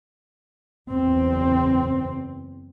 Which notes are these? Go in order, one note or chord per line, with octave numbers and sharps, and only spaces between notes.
F#1 E2 C4